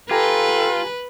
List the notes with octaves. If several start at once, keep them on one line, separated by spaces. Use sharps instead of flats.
F4 G4 A4 B4 G5 G#5 A#5